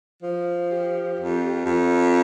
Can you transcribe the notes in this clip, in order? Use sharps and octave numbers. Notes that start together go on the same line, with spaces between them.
F3
G4
F2
F2